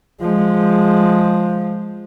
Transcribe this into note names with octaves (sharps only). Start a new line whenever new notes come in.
F3 G#3